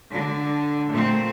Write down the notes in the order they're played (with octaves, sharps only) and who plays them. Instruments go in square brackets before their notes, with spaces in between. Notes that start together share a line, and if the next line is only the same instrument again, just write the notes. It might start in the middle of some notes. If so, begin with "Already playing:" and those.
[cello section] D3
A#2 A3 C4